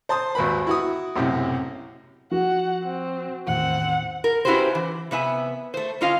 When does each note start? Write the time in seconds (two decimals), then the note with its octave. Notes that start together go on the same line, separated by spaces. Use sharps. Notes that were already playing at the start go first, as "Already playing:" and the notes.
0.09 C5 A5 C6 D#6
0.35 G#1 D#2 B4 B5
0.67 E4 F#4 D#6
1.16 B1 F#2 A2 C3
2.32 F3 F#4 F#5
2.83 C4
3.47 E2 A2 D#3 C4 F#5
4.24 A#4
4.45 C#4 E4 F#4 G4 B4 C5
4.75 E3
5.11 C3 B3 E5 G#5
5.74 A3 C5
6.01 D3 C#4 F4 D#5 F5